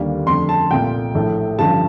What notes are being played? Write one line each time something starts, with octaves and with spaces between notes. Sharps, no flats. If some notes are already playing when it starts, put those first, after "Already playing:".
Already playing: D#2 D3 G3 A#3
F2 D3 A3 C6
A5
C2 A#2 A3 G5
A#1 A2 A3
A1 G2 D3 F3 A5